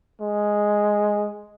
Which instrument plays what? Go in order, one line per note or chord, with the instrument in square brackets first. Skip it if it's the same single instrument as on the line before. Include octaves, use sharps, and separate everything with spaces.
[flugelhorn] G#3